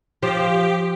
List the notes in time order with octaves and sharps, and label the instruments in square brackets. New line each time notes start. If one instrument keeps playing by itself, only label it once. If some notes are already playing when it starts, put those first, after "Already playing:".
[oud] F3 [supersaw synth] G4